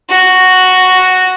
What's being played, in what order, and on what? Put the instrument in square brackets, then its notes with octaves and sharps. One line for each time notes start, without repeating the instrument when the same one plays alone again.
[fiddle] F#4